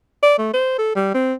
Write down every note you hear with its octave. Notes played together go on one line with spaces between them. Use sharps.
D5
A3
C5
A4
G3
C4